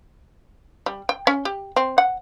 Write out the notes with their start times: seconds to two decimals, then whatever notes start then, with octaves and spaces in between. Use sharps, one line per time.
0.86 G3
1.09 G5
1.27 C#4
1.45 G4
1.76 C4
1.98 F#5